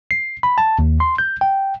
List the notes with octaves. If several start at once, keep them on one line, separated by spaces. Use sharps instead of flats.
C7
B5
A5
D#2
C6
G6
G5